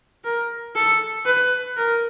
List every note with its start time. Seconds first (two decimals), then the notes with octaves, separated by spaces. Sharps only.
0.25 A#4
0.76 A4
1.26 B4
1.77 A#4